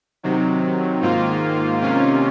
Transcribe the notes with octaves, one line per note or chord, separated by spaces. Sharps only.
C3 D#3 F#3
G#2 D#3 A#3 F4
C3 D#3 A#3 C#4 F4